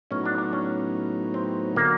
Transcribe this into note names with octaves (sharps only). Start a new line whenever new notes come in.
A2 F#3 B3 C#4 D#4
D4
D4
C#4
C4
D3 F#3 A#3